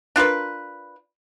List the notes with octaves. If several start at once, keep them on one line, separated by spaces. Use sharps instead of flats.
D4 F4 A#4 B4